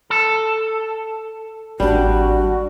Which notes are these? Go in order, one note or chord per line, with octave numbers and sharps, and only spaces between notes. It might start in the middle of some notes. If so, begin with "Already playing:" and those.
A4
G#1 G3 D4 F#4